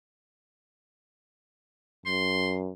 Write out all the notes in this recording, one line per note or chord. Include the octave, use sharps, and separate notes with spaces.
F#2 C6